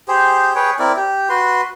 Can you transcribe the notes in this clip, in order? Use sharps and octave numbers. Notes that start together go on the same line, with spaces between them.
G4 G#4 C5
G#4 B4 C#5 G5
C4 E4 A#4 D5
G4
F#4 B4 C6